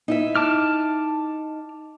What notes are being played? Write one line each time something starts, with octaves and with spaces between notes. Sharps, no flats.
D#4 E4 E5
A5 D6 F6